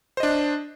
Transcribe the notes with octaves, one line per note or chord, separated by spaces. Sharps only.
D4 C5 D#5